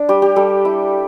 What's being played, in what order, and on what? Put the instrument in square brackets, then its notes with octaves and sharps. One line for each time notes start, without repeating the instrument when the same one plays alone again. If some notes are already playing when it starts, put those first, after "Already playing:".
Already playing: [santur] D4
G3 G4
G4
G3 A4
E4